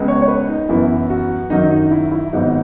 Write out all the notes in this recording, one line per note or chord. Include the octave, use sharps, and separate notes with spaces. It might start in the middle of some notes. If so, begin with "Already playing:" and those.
Already playing: C#2 C#3 G#3 B3
C#5
C#5
B4
D#4
F#2 E3 B3 E4
F#4
F#2 D#3 F#3 D#4
D#4
E4
E4
G#1 G#2 F#3 B3 D#4